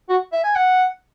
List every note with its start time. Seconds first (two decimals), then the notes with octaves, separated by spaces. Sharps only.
0.09 F#4
0.32 E5
0.44 G#5
0.56 F#5